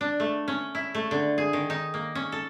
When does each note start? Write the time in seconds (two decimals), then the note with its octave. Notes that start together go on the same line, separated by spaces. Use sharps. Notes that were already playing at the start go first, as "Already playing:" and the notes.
0.01 D4
0.20 A3
0.48 C#4
0.75 E4
0.95 A3
1.11 D3
1.38 G#4
1.53 D#3
1.70 D#4
1.94 A#3
2.15 C#4
2.32 A4